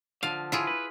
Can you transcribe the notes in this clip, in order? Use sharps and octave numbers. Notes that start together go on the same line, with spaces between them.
D3 F3 F5
E4 F4 G#4
B4